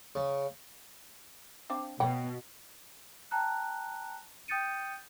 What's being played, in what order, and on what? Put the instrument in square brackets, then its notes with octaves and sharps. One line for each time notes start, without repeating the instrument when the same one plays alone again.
[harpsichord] C#3
[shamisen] C4 D4 F5
[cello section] B2 [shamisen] C#5 F#5 G5
[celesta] G5 A5 A#5 F#6
G5 D#6 G6 A6 C#7 D#7